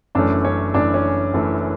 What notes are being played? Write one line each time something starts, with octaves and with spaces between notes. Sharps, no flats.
F#1 F#2 E3 A3 C#4 D4 D5
C#4 C#5
F#1 F#2 E3 A3 C#4 D4 D5
C#4 C#5
F#1 F#2 E3 A3 C#4